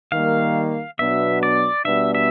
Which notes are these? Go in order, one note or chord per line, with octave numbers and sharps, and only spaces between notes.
D#3 G3 A#3 F5
B2 F#3 B3 D4 E5
D5
B2 G3 B3 D4 E5
E5